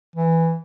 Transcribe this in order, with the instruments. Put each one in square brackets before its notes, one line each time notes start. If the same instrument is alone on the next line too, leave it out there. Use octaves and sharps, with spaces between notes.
[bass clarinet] E3